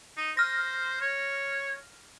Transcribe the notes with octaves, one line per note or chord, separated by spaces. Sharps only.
D#4
C5 F6 A#6
C#5